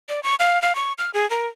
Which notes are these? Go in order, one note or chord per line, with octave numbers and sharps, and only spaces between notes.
D5
C#6
F5
F5
C#6
F6
G#4
A#4